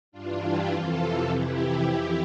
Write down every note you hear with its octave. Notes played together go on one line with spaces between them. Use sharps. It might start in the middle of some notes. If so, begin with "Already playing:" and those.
G2 E3 D4 F4
E4 G4
F2 C3 E3 F4 A4
F2 C3 E3 E4 G4
F2 E3